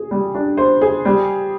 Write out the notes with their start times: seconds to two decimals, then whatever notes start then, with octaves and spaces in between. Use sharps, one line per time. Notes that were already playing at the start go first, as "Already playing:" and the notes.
Already playing: G#4
0.11 G3
0.35 D4
0.57 C5
0.81 G#4
1.05 G3